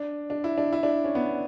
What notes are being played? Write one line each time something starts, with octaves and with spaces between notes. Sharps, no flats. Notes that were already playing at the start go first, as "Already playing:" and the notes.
Already playing: D4
D4
E4
D4
E4
D4
C#4
B3